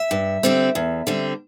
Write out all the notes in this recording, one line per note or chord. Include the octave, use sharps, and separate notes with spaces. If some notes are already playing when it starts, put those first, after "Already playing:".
Already playing: E5
G2
D3 G3 C4
E2
D3 G3 C4